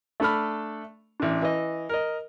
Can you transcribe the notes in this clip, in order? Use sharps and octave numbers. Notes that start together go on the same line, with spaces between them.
A3 D4 A4 B5 F6
A1 D4
E3 D#5
A#4 D#5